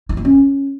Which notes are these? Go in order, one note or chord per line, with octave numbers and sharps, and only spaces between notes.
E4
A#3
C#4